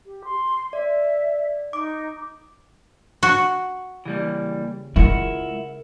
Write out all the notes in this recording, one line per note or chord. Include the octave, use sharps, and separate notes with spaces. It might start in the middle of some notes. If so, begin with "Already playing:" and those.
G4
C6
D5 E5
D#4 D6
F#4
C#3 E3 G3 A#3
G#3 E4 F4 A#4 F#5